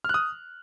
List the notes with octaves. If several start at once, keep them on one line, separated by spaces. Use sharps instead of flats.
D#6 F6 F#6